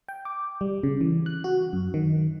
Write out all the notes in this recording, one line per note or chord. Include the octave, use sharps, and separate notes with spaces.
G5
D6
G3
C#3
E3
F#6
F#4
F#2
D#3